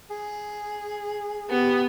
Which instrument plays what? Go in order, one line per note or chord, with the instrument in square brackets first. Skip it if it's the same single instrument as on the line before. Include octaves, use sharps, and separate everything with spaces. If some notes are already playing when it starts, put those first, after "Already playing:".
[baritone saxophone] G#4
[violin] B3 [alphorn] G4